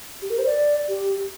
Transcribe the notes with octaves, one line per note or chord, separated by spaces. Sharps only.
G4
A#4
C5
D5
G4